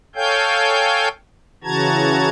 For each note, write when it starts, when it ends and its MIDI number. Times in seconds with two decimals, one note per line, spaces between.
0.15 1.08 69
0.15 1.08 73
0.15 1.08 77
0.15 1.08 79
0.15 1.08 80
0.15 1.08 91
1.64 2.29 49
1.64 2.29 52
1.64 2.29 66
1.64 2.29 81
1.64 2.29 82
1.64 2.29 92